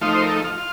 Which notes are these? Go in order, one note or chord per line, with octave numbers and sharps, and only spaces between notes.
F3 A3 D#4 F4
C5
A#4
A4
F4
F4